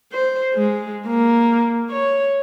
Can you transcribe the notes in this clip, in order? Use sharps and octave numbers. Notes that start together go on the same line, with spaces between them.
C5
G#3
A#3
C#5